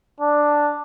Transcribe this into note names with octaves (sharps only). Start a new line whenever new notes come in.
D4